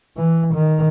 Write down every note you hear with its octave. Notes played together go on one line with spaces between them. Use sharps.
E3
D#3